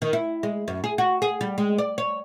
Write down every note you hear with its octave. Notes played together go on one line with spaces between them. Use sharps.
D#3
E4
G#3
F#2
G#4
F#4
G#4
G3
G#3
D5
C#5